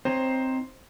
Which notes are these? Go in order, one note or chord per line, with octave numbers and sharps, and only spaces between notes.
C4 D#4 C5 C#5